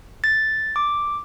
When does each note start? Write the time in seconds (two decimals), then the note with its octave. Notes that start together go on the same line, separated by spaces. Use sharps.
0.24 A6
0.76 D6